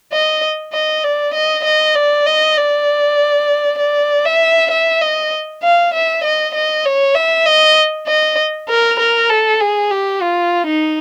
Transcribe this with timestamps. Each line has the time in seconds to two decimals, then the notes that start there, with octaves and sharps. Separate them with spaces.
0.13 D#5
0.73 D#5
1.03 D5
1.34 D#5
1.64 D#5
1.95 D5
2.26 D#5
2.57 D5
3.79 D5
4.25 E5
4.71 E5
5.01 D#5
5.63 F5
5.94 E5
6.24 D#5
6.55 D#5
6.85 C#5
7.15 E5
7.46 D#5
8.07 D#5
8.69 A#4
8.99 A#4
9.29 A4
9.61 G#4
9.91 G4
10.22 F4
10.66 D#4